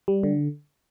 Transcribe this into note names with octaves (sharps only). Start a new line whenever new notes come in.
G3
D3